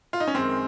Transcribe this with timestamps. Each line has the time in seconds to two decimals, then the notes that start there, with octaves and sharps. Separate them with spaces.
0.13 F4
0.20 D#4
0.28 C#4
0.34 F#2 D#3 G#3 C4